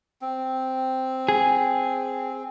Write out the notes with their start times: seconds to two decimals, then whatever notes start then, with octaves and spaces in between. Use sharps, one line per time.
0.21 C4
1.29 G#4